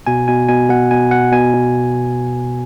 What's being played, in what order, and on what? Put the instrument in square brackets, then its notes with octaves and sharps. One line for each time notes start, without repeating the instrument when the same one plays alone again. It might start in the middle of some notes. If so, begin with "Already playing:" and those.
[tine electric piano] B2 G#5
B2 G#5
B2 G#5
B2 F#5
B2 G#5
B2 F#5
B2 G#5
B2